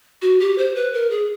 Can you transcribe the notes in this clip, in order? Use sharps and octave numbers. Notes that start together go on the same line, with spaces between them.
F#4
G4
C5
B4
A#4
G#4